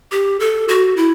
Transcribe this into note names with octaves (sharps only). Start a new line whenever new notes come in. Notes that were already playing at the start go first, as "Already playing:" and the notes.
G4
A4
F#4
E4